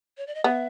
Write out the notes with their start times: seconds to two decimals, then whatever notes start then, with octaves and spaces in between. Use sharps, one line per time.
0.18 C#5
0.27 D5
0.35 D#5
0.44 B3 E5